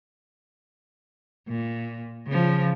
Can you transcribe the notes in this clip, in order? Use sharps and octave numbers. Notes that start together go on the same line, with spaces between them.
A#2
C#3 F3